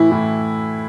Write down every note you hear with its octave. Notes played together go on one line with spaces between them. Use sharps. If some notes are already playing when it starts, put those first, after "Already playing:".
Already playing: A2 E3 E4
A2 E3